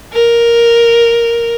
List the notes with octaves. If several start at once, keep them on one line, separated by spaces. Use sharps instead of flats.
A#4